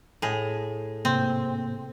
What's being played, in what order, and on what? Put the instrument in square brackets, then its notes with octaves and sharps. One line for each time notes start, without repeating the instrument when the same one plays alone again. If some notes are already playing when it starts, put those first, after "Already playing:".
[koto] A2 G#4
[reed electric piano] G#2 C3 A#3 [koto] C4